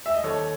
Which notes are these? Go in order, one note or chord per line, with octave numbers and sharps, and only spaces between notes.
E5
D#5
D#2 A4 C#5